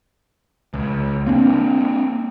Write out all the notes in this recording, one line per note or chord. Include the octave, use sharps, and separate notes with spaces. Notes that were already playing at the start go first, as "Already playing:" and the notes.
C#2
A#3 C4 D4